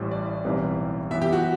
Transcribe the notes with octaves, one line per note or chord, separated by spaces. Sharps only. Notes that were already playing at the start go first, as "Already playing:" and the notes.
Already playing: A1 A2 G3 C5
D5
B1 A2 E3 G3 C4
F#2 E3 B3 E5
G4
F#4